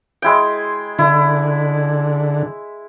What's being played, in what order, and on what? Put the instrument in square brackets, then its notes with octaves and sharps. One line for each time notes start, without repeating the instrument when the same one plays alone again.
[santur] G#3 E4 G5
[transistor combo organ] D3 [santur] E4